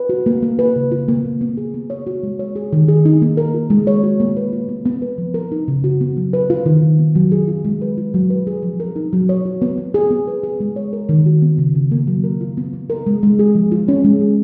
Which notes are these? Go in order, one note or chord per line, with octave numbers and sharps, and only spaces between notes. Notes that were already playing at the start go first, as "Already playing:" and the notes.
Already playing: B4
F#4
A#3
A#3
B4
C#3
F4
A#3
B3
B3
G#4
B3
C#5
F#4
G#3
C#5
G#4
D#3
G#4
D#4
A#3
A#4
F4
G#3
C#5
F#4
A#3
B4
F4
B3
B3
B4
F3
A#4
D#4
C#3
F#4
B3
F#3
B4
F4
D#3
D#4
B3
F#3
G#4
F4
G#3
B4
F4
F#3
B4
G#4
F3
A#4
D#4
F#3
C#5
F#4
B3
B3
G#4
B3
B4
G#4
G#3
C#5
A#4
D#3
F#4
B3
C#3
C#3
A#3
F#3
A#4
F4
B3
B3
A#4
G#3
G#3
G#4
F3
F4
C#4
G#3
G#4